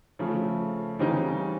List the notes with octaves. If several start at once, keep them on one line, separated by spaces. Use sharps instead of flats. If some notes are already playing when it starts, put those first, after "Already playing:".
C#3 F3 A3
C#3 E3 G3 C4 D#4